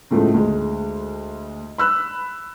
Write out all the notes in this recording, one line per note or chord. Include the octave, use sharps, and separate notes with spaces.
C#2 A2 F3 G#3 A3
D2 G#3
B5 E6 F#6